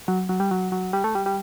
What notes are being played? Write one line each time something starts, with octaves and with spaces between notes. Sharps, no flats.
F#3
F#3
G3
F#3
F#3
G3
A3
G3
G3